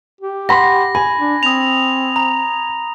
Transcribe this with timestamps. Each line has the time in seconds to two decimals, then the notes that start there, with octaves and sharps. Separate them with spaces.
0.21 G4
0.49 F#5 B5 C6 A#6
0.95 G#5 B5
1.19 D4
1.43 C4 D#6 F7
2.16 A#5